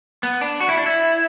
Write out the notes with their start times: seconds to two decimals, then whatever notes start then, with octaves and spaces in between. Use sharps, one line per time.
0.23 B3
0.41 D4
0.61 F#4
0.69 E4
0.78 D4
0.86 E4